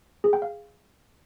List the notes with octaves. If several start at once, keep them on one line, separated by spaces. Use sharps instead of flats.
G#4
G5
F5